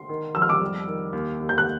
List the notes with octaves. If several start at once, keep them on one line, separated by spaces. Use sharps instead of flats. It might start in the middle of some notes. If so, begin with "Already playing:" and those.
Already playing: C6
D#3
F2 E6
F6
D6 E6
G3
D#3
D#2
D#2
G6
F#6